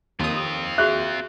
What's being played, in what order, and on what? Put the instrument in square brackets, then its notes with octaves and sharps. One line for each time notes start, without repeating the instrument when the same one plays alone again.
[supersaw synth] D#2 D#6 [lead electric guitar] C4 F4
[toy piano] F#4 G#4 E5 [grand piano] F#6